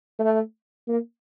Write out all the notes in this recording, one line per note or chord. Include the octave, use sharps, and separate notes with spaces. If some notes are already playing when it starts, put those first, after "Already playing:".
A3
A#3